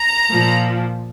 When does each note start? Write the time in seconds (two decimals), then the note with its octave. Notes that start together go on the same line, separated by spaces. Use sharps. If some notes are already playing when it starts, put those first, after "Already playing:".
Already playing: A#5
0.29 A#2 F3